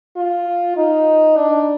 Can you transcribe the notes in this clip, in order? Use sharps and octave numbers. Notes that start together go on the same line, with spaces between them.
F4
D#4
D4